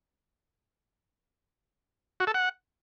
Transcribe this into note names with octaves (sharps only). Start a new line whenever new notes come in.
F#4
A4
F#5